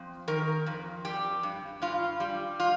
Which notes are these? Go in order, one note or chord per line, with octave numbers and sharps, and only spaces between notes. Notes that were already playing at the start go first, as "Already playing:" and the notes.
Already playing: F2 C4
D#3 A#4
F2
G3 G4
G2
G2 F4
G3
F4